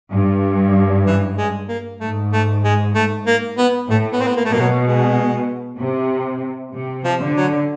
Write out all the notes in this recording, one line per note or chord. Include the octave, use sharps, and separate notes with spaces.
G2
E3
G#3
A#3
G#2 A3
A3
G#3
A3
A#3
B3
A2 A3
B3
C4
B3
A#3
A3
B2 A#3
F#3
G#3
C3
C3
F3
D3
F#3